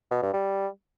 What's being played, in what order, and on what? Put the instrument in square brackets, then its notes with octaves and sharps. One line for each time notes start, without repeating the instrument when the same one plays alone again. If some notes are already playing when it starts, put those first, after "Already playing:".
[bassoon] B2
G2
G3